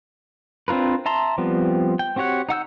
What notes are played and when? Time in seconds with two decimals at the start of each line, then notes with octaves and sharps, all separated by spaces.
0.68 C4 D4 F4 A#4 B4
1.06 E5 A5 A#5 C6
1.38 F3 G3 B3 C4
1.99 G5
2.16 C4 F#4 G4 C#5 F#5
2.49 D#4 F#5 E6 G6